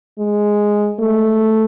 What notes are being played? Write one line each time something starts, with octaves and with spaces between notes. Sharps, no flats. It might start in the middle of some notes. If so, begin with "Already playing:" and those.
G#3
A3